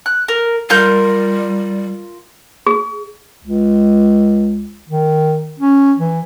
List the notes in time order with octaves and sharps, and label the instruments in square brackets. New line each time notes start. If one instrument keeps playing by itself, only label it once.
[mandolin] F#6
A#4
[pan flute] G3 [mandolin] F4 A#4 G6
[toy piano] G#4
[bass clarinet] C#2
D#3
C#4
E3